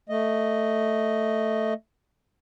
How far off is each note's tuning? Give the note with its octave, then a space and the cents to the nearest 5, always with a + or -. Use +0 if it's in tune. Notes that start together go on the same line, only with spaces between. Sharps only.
A3 +5 D#5 +0